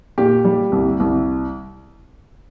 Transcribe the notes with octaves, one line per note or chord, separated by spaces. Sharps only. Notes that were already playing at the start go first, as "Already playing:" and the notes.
A#2 G4
G3
C2
C2